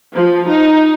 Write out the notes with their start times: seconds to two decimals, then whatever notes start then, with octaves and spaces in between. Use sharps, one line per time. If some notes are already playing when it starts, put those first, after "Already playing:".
0.15 F3
0.48 D#4